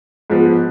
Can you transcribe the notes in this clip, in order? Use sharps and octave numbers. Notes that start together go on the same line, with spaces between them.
G#2 F3 B3